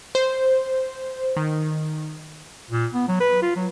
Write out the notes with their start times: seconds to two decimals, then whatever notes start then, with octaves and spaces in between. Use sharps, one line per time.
0.15 C5
1.36 D#3
2.71 A#2
2.94 B3
3.08 F#3
3.21 B4
3.42 F4
3.56 F#3